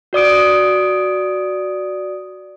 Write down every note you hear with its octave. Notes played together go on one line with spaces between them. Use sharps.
F#4 D5 D#6 D7